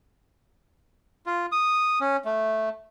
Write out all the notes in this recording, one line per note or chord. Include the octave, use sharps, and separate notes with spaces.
F4
D#6
C#4
A3